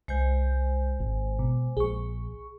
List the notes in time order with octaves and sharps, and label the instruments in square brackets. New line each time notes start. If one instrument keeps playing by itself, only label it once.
[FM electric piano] C2 G6 [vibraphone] G#3 C5 G#5
[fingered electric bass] G#1
[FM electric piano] B2
[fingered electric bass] A#1 [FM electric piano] G#4 C#6